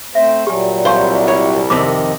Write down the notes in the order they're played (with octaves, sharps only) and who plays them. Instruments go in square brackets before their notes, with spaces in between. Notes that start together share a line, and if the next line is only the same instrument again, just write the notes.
[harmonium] A3 C4 C5 [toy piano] E5
[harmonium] A#2 F#3 G3 [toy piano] G4 G#5
[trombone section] C2 [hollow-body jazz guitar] C5 [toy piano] F5 G#5 C#6
[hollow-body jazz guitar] C#5
[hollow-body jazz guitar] F2 C3 [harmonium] D#3 D#5 [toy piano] D6